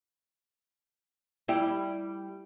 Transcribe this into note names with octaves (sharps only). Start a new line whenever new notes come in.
G3 E4 G4